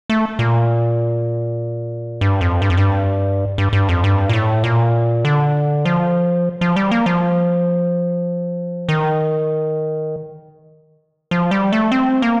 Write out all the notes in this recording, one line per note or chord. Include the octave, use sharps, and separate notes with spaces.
A3
A#2
G2
F2
G2
F2
G2
G2
G2
F2
G2
A#2
A2
A#2
D3
F3
F3
G3
A#3
F3
D#3
F3
G3
A3
C4
A#3